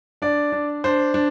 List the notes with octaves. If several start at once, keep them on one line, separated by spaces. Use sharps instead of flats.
D4 D5
D4
D4 C5
D4